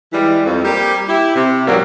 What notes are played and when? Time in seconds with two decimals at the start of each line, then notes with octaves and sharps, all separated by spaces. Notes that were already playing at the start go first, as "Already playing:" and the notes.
0.13 E3 G3 G#3
0.45 F2
0.65 G3 A#3 C4 G4
1.08 E4 G4
1.35 C3
1.66 G#2 B2 E3 F#3 G3 A#3